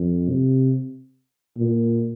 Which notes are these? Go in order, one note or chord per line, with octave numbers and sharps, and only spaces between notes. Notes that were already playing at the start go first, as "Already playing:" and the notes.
Already playing: F2
C3
A#2